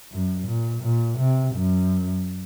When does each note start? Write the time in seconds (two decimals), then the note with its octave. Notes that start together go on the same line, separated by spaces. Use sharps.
0.12 F#2
0.47 A#2
0.83 A#2
1.18 C3
1.55 F#2